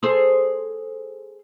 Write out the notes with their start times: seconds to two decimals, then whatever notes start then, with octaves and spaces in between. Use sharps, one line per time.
0.03 G#4 A4 C5